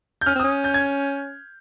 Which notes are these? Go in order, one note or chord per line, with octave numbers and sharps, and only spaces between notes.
G6
C#4 F6
C4
D#6
C#4
G6
G#6